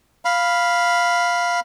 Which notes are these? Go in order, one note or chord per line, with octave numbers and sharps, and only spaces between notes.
F5 B5